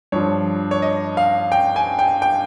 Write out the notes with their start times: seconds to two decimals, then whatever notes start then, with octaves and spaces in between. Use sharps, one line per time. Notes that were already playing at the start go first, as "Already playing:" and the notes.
0.12 G2 F3 C#5
0.71 C#5
0.82 D#5
1.17 F5
1.52 G5
1.76 G#5
1.99 G5
2.22 G5